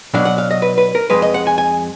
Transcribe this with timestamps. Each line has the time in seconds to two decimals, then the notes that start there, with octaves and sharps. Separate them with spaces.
0.14 B2 F#3 D4 F5
0.25 F#5
0.38 F5
0.51 D#5
0.62 B4
0.78 B4
0.95 A#4
1.10 F2 F3 G#3 B4
1.22 D#5
1.34 F#5
1.47 G#5
1.58 G#5